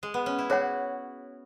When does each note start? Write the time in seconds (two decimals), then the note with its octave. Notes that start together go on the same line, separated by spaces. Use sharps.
0.03 G#3
0.14 B3
0.26 C#4
0.39 E4
0.50 F#4 G#4 C#5 F#5